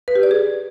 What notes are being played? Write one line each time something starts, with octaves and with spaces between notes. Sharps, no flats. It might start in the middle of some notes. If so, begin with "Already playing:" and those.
B4
G4
D5
G#4